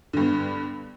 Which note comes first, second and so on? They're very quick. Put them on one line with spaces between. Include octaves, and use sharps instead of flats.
D3 G2 B3